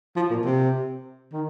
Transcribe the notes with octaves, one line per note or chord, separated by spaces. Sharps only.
F3
A#2
C3
D#3